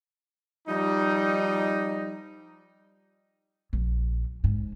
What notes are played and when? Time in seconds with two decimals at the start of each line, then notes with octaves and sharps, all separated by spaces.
0.68 F3 G3 D#4
3.73 A#1
4.44 G#2